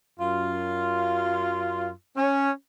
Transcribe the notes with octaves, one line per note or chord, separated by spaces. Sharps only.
F#2 F4
C#4